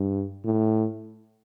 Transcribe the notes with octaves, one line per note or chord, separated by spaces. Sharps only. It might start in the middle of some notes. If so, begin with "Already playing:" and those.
Already playing: G2
A2